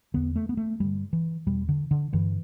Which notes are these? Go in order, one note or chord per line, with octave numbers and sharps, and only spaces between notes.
E2 D3 B3
A3
B3
A3
G2 D3 G3
E3
E2 B2 G3
D3
D3
G2 D3 E3